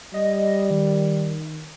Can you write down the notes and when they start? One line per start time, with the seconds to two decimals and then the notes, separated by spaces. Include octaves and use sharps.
0.14 G3 D#5
0.70 D#3